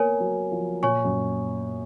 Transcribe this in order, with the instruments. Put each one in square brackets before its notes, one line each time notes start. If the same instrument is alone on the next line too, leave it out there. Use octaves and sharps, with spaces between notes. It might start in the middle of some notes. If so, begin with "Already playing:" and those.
Already playing: [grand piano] A#3 B3 [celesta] A#4 C#5 G#5
[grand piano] F#3
F3
[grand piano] A#2 [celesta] C#5 G#5 C#6
[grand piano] F#2